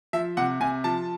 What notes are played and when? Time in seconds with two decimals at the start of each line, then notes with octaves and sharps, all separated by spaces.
0.13 F3 E5
0.37 C3 F#5
0.60 C3 G#5
0.84 F3 A5